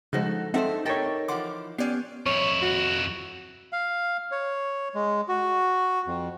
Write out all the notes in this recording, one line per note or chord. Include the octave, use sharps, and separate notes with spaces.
C#3 F3 G#3 D#4 F#4 A4
G2 C4 D#4 A4 C5 E5 F#5
D#4 G4 A4 A#4 C#5 G5
E3 F3 F#5 C6 D6
B3 C#4 G4 D5 G#6 C7
F2 E4 C#5
F#4
F5
C#5
G#3
F#4
F2